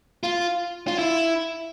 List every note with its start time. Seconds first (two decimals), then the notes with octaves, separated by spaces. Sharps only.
0.23 F4
0.88 F4
0.99 E4